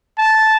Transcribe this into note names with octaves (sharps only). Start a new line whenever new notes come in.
A5